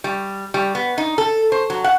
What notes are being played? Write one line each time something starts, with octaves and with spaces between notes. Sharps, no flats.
G3
G3
B3
D#4
A4
C5
F#3
F#5